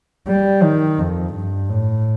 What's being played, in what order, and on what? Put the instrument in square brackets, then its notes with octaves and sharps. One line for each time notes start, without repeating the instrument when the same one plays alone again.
[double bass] G3
D#3
F2
G2
A2